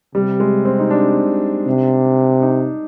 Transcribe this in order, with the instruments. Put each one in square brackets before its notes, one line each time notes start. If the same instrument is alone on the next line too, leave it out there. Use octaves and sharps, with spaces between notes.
[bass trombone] C3 [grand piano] G3
[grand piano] G#3
C4
D#4
D4
[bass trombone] C3
[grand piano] D#4